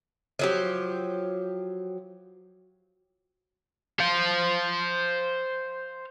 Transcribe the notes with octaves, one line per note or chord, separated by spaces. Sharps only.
F3 F#3 G4
C5 F5